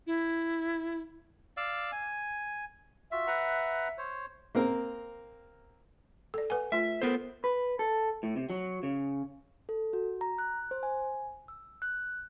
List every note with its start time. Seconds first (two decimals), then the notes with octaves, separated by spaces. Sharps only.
0.07 E4
1.57 D5 F5 E6
1.92 G#5
3.12 F4 F#4 E5
3.27 B4 F#5 A#5
3.98 C5 C#5
4.55 A#3 C4 A#4
6.34 A4 D5
6.50 B4 F#5 G#5
6.72 A3 F4 E5
7.02 B3 A4 A#4 C5
7.44 B4
7.79 A4
8.23 A2
8.36 C3
8.50 F#3
8.83 C#3
9.69 A4
9.93 F#4
10.21 A#5
10.38 F#6
10.71 C5
10.83 G#5
11.48 E6
11.82 F#6